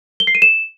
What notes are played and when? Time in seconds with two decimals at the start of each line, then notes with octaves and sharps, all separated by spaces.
0.20 G7
0.27 C7
0.35 D#7
0.42 E7